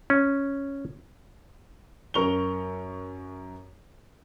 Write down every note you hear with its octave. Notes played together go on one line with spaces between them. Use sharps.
C#4
F#2 A#4 C#6 F7 G7